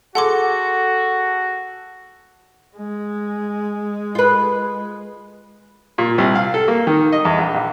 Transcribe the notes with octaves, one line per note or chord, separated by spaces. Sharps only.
F#4 G#4 A4 F#5 C6 D6
G#3
F4 B4
A#2
C2
F5
A4
A#3
D#3
D#5
E2
A#1
A#1